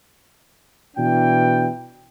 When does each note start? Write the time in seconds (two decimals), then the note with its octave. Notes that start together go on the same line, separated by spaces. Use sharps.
0.97 B2 E3 D4 G5